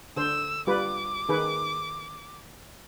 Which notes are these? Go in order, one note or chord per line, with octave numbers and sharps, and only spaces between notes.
D3 C5 E6
G3 F4 B4 D6
D#3 G#4 B4